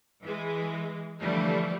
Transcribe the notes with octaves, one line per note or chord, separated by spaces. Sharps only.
E3 G#3
D3 E3 F3 G3 A3